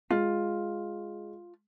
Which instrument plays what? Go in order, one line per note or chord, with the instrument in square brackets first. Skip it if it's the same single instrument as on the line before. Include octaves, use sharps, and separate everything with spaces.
[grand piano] G#3 [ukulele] F4